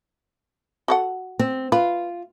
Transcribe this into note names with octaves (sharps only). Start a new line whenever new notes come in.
F#4 A4 F#5
C4
F4 B4